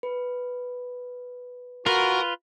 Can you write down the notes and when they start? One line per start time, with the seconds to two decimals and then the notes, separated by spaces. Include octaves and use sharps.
0.03 B4
1.86 F4 F#4 A#4 B4